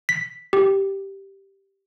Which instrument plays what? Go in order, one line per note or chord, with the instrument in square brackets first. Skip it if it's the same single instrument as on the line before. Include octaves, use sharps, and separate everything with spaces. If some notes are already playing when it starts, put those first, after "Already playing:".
[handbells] B6
G4